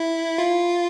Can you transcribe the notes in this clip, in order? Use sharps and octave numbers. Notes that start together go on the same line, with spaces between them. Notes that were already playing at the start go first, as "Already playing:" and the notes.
Already playing: E4
F4